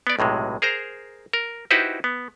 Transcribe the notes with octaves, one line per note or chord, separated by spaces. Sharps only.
B3 D5
B1 A2 C3 G#3
G#4 A#4 C5 A#5
A#4
D#4 E4 F#4 G4 B4 C5
B3